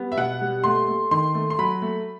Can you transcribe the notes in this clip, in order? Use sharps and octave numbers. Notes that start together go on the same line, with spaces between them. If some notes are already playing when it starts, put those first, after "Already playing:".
Already playing: G3 B3
E5
B2 F#5
G3
A3 C6
A3
D#3 C6
A3
C6
F#3 B5
A3